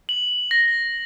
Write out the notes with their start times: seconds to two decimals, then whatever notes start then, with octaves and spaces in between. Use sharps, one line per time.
0.09 F#7
0.51 A#6